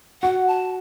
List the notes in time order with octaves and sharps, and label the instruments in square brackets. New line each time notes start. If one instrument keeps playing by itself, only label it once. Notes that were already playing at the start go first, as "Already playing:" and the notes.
[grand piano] F#4 [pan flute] F#5
[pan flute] A5